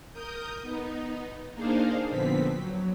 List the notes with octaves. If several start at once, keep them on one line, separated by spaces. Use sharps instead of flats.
A#4 D#6 G6
B3 D#4
A#3 D4 D#4 G#4 C5 F5
F2 A#2 D3 B3 C4 B6
F#3